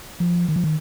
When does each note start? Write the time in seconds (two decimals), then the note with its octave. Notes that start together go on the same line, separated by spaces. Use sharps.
0.20 F3
0.48 D#3
0.56 F3
0.64 D#3